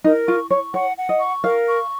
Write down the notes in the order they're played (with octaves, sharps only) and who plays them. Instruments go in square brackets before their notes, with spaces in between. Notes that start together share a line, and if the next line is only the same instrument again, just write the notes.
[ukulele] D#4 [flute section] A#4
[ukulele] F4 [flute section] C#6
[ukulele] C#5 [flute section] C#6
[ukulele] C#5 [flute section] F#5
[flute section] F#5
[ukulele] D#5
[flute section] C#6
[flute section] A#4 [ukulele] F5
[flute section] C#6